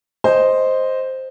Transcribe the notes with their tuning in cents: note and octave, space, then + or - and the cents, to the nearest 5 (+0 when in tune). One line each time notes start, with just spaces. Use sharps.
C5 +0 D#5 +0